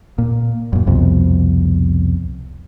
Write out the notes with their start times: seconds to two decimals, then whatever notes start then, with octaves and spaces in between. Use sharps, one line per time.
0.18 A#2
0.73 F#2 A#2
0.87 C2 F2 B2